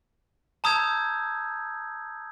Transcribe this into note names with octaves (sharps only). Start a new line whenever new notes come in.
A5 A#5 D#6 E6 G6 G#6